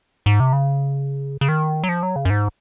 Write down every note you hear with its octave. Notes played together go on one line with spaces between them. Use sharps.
G#2
C3
C#3
C#3
D#3
F#3
F3
F#3
C#3
F#2
G#2